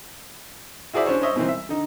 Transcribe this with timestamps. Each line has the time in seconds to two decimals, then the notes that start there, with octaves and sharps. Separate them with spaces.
0.93 E4 F#4 G#4 C5 D5 E5
1.06 C#4 D4 C5 C#5
1.21 C5 C#5 D#5 E5 C#6
1.36 B2 D#3 E3 C4
1.48 E5
1.69 D3 D#4